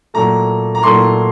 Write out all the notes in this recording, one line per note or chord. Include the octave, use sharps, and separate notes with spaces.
A#2 F#3 A3 A#5
A#5
A#2 F#3 A3 C6